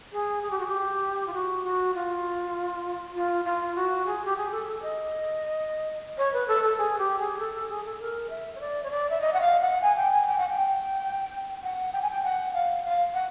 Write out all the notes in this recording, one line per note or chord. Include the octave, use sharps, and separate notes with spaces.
G#4
G#4
G4
F#4
G4
F4
F#4
F#4
F4
F4
F4
F#4
G#4
G4
G#4
A4
A4
D#5
C#5
B4
A4
A4
G#4
G4
G#4
A4
A4
G#4
A4
A#4
E5
C#5
D5
C#5
D5
E5
D#5
F#5
F5
F#5
G#5
G5
G#5
G5
F#5
G5
F#5
G5
G#5
G5
F#5
F5
F5
F#5